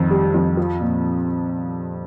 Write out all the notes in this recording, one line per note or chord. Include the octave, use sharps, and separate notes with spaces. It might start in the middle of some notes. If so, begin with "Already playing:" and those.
Already playing: F2 D#3
G3
F2
F3
A#2